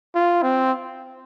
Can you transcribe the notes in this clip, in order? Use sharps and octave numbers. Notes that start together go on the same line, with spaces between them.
F4
C4